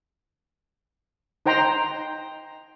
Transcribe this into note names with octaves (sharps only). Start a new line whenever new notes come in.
D#4 C5 G5 A#5 C6